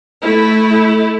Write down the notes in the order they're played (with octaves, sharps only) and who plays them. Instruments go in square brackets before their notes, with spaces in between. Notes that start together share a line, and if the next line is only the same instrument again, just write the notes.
[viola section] A3 E4